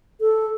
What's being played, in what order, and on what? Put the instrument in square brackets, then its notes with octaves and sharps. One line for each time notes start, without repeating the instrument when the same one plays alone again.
[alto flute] A4